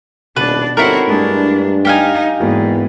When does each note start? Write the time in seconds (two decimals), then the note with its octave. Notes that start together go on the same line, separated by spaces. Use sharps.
0.36 D#1 B2 D4 B4 D5
0.77 G1 C4 D#4 E4 F#4 A4 A#4 C#5
1.08 G2 G#3 A3 D4 G#4
1.85 D#4 G4 F5 G#5
2.40 E2 G#2 A#3 B3 F#4